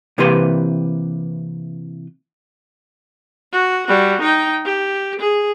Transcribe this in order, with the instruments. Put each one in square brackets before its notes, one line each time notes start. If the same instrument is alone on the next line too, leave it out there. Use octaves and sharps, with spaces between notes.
[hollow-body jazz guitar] C3 E3 A#3 G4 B4 C6
[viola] F#4
G3 F#4
D#4 G5
G4
G#4